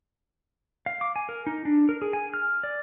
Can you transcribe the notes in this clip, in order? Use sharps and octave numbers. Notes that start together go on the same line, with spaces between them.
F5
D6
G#5
A#4
D#4
D4
A#4
G#4
G#5
F6
D5